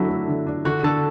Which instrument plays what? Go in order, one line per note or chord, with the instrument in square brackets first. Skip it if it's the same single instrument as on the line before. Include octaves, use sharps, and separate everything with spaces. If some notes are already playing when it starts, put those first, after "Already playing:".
Already playing: [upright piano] D3 F#3 D4 [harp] E4 A4
[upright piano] A3
D3
D4
[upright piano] D3 [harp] F#4
[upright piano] D3 [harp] A4